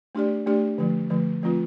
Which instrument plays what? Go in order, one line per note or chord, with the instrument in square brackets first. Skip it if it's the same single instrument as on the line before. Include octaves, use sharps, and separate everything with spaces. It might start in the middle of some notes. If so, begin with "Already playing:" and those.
[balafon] A3 D4 G4 D5
A3 D4 G4 D5
D3 F3 A3
D3 F3 A3
F3 A3 C4 F4 B4